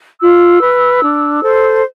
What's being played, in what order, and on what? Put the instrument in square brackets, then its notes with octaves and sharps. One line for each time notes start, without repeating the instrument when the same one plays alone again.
[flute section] F4 E6
B4
D4
A4 C5